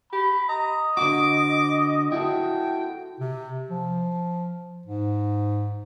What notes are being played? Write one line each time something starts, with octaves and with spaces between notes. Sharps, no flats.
G4 B5
D#5 A#5
D3 F#4 D6
E4 F#4 A4 G5
C3
F3
G#2